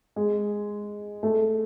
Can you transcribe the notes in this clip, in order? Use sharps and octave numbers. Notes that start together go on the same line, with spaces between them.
G#3
A3